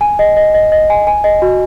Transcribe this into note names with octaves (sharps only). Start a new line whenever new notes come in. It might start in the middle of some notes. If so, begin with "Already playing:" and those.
G#5
D#5
D#5
D#5
D#5
G#5
G#5
D#5
F#4